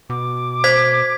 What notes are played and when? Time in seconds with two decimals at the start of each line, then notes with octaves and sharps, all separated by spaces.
0.10 B2 D6
0.64 C5 G#6 B6